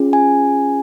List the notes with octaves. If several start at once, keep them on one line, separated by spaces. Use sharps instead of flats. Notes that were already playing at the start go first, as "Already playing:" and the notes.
Already playing: C#4 F4 G#4
G#5